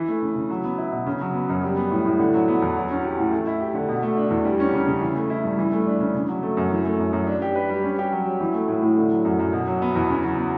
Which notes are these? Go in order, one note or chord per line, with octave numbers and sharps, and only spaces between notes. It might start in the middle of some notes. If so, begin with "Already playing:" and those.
Already playing: E3
A3
C#3
C#3
F#3
B3
E4
B2
C#3
F#3
B3
F#2
G3
B3
A2
A2
D3
F#3
B3
E2
F#3
C#4
G4
A2
A3
E4
G4
D3
B2
A3
D4
E2
G3
C#4
C#3
C#3
E3
A3
E4
G2
E3
A3
D4
C#3
C#3
F#3
A3
F#2
E3
A3
F#2
F#2
D4
G4
B4
G3
C#4
G4
F#3
F#3
E3
A3
A2
A2
D3
F#3
F#2
F#2
B2
F#3
B3
E2
C#3
F#3
B3